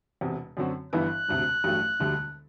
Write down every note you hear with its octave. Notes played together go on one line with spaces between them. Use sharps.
E1 E2 C3
F#2 D3 F#3 C4 F#4
G1 G2 E3 B3 E4 F#6
E1 D2 C3
A1 G2 F#3 A3
E1 D2 D3 G3